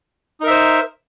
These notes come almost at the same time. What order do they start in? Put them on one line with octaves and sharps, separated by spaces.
D#4 A#4 E5 C5